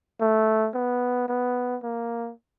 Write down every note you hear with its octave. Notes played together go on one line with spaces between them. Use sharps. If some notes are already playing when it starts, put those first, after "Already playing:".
A3
B3
B3
A#3